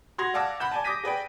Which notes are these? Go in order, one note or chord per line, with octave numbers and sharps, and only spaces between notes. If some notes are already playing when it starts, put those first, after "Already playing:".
F#4 C6 G#6 A#6 F7
D5 F5 F#5 A5 D6 E6
F#5 B5 G6 E7
D5 G#5 A5
D6 D#6 G6 A#6 B6 D#7
G#4 B4 D5 G5